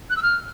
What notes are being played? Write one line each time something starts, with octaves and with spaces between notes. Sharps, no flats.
F#6
E6
F6